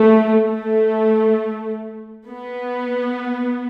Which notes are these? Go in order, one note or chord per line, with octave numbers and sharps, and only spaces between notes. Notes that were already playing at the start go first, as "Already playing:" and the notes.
Already playing: A3
A3
B3